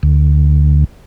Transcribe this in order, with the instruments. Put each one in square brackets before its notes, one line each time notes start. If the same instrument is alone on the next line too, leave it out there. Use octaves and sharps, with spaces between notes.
[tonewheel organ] D2